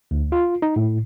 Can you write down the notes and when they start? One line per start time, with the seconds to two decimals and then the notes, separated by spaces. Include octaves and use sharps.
0.11 D2
0.32 F4
0.62 D#4
0.76 A2